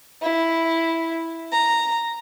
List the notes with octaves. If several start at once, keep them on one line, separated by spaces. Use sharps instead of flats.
E4
A#5